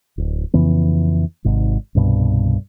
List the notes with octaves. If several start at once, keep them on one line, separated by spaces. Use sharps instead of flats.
D1
F2 C#3 E3 B3
G#1 G#2 C3
C2 G2 B2